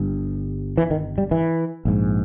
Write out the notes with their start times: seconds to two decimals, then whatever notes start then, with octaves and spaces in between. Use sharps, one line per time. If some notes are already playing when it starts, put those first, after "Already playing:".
Already playing: G1 G2
0.77 E3
0.90 D#3
1.18 G3
1.31 E3
1.85 A#1 G#2